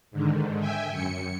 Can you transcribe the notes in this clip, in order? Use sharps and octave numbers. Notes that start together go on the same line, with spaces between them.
G#2 D3 D#3
E5 G5 G#5
F#2 C#7